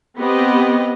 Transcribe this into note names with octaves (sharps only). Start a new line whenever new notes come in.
B3 C4 G4 D#5